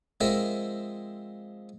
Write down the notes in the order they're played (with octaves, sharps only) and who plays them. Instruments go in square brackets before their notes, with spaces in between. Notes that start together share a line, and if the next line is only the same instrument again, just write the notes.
[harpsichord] F3 G#3 C4 A#4 E5